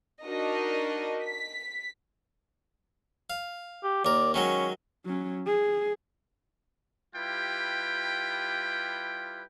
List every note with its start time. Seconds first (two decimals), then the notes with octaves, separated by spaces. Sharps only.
0.24 D4 D#4 F#4 A#4 D#5
1.24 B6
3.30 F5
3.84 G4
4.05 D#2 A#4 D5
4.34 D#3 F#3 G#3 C#4
5.05 F#3 C#4
5.46 G#4
7.15 G3 E4 F4 G4 B4 G5